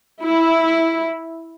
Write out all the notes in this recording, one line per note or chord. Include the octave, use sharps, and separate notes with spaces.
E4